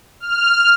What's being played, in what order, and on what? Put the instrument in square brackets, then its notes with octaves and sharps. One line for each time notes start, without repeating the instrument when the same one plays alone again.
[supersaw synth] F6